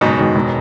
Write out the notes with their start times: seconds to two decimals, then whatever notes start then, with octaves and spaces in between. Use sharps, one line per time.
0.01 F#1 G#2 B2
0.18 F#2 D#3 G#3 B3
0.36 E1